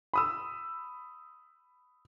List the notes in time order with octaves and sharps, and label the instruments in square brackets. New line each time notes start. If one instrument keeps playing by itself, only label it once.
[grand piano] B5 D#6 E6